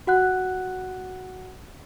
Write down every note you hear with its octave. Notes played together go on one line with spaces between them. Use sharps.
F#4 F#5 F#6